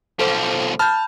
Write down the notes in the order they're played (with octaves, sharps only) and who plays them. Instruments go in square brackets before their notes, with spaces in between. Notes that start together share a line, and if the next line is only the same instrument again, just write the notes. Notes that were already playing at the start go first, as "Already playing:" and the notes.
[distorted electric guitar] B1 F3 [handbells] A4 C5
[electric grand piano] A5 F6 [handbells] B5 G6